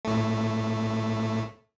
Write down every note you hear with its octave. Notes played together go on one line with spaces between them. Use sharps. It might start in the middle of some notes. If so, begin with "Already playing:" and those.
A2 A3